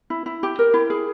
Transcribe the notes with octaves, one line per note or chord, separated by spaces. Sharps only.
E4
E4
G4
A#4
E4
G#4